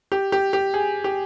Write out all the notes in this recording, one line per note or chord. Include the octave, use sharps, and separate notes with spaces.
G4
G4
G4
G#4
G4